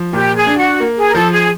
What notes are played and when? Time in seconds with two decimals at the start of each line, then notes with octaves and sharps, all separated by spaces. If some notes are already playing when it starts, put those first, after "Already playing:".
Already playing: F3
0.13 A#2 G4
0.36 G#4
0.47 D4
0.58 F#4
0.80 A#3
0.98 G#4
1.08 A#4
1.14 F3 A4
1.32 G#4